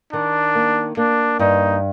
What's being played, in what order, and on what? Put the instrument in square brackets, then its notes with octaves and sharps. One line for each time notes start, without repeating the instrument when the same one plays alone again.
[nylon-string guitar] D#3 [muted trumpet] D4
[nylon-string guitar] A#3
[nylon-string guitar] A#3 [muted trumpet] D4
[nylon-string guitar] G2 [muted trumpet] D#4